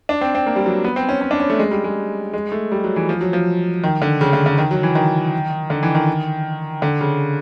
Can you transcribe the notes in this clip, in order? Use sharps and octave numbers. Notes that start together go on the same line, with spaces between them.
D4
C4
C4
A#3
G3
F#3
B3
C4
C#4
C#4
D4
C#4
A3
G#3
G3
G#3
G#3
A3
G3
F#3
E3
F3
F#3
F3
D#3
D3
C#3
D3
D3
D#3
F#3
E3
D#3
D3
E3
D#3
D3
C#3